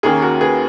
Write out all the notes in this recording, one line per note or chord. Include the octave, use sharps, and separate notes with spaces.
D#2 D#3 A#3 C#4 G#4
F#4 A#4
G#4 B4